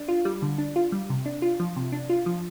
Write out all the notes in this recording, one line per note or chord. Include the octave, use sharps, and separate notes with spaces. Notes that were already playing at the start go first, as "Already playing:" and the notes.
Already playing: D4
F4
G3
D3
D4
F4
G3
C3
D4
F4
F3
C3
D4
F4
F3